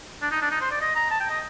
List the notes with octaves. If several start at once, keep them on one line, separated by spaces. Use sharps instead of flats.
D4
D#4
D4
D#4
C5
D5
D#5
A#5
A5
G5
D#5